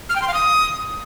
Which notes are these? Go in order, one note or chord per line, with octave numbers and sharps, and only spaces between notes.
F6
G5
C6
F5
D#6